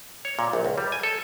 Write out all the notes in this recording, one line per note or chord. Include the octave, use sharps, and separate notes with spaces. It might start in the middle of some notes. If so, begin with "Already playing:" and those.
C#5
A#2
A#1
C#2
G3
G#5
A4